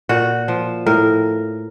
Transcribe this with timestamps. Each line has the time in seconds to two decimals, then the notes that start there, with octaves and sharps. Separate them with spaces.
0.09 A#2 F#4
0.48 F3
0.86 A2 A#4